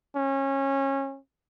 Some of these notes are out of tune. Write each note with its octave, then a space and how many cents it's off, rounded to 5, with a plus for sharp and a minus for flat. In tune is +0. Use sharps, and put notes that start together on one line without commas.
C#4 -25